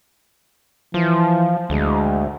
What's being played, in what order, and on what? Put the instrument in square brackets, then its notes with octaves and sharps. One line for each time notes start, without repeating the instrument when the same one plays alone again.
[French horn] E3 [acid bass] F3
[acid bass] D2 [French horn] G#3